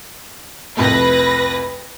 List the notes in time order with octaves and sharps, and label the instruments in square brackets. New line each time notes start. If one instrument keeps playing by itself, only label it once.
[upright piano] C2 F2 A3 [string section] B4 A#6